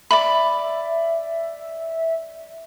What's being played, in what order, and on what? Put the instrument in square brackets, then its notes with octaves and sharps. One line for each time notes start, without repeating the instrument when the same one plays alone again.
[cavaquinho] D5 B5 [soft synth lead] E5